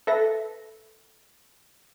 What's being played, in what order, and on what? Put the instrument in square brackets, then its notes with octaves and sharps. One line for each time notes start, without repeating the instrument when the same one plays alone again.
[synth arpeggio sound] A4 B4 E5 A#6